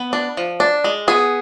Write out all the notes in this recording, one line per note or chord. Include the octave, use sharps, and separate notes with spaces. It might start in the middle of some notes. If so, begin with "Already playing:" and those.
Already playing: B3
D4
F3
D4
G#3
B3 G#4